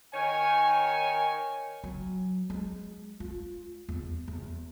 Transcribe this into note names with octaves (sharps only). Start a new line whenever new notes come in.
D#3 C#5 G#5
F#3
G#3
F4
E2
E2